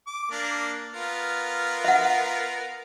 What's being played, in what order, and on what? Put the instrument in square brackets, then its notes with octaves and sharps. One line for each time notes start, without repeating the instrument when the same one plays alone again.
[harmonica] D6
A#3 D4
B3 F4 A#4
[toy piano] E5 F#5